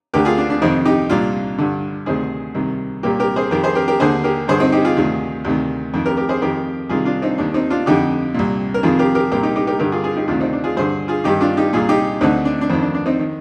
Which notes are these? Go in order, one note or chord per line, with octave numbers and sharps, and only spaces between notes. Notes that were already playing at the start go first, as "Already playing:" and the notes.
D2 D3 G4 A#4
F4 G#4
D4
D4
F2 C3 D#3 C4 D#4
D#4 G4
C2 A#2 D4 F4
G2 D3
D2 C3 D#3 G#4 C5
C2 C3 D#3
C2 A#2 G4 A#4
G4 A#4
G#4 C5
F2 D#3 G4 A#4
G#4 C5
G4 A#4
G4 A#4
D#2 D3 G#4 C5
G4 A#4
G2 D3 G#4 C5
C4 D#4
D#4 G4
F4 G#4
D2 C3 D#3
D2 C3 D#3
F2 D#3
G4 A#4
G4 A#4
G#4 C5
F2 D#3 G4 A#4
C2 C3 D#3 F4 G#4
D4 F4
C4 D#4
D#2 D#3 D4
C4 D#4
D4 F4
F2 D3 D#4 G4
C2 A#2
A#4
F2 C3 D#3 F4 G#4
G4 A#4
G4 A#4
C2 A#2 G4 A#4
D#4 G4
D#4 G4
G4 A#4
G2 D3 G4 A#4
F4 G#4
F4 G#4
D#4 G4
D2 C3 D#3 D4 F4
C4 D#4
D4
F4 G#4
G2 D3 G#4 C5
F4 G#4
G2 D#3 D#4 G4
D4 F4
D#4 G4
C2 A#2 F4 G#4
D#4 G4
D2 D3 C4 D#4
D4
D4
F2 D#3 C4
D4
D4
C4 D#4
D#3